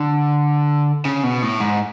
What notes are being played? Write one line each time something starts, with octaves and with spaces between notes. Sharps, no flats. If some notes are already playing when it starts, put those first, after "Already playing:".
Already playing: D3
C#3
B2
A2
G#2